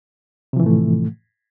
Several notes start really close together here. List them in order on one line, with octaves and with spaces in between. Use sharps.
C3 F3 E3 A2 A3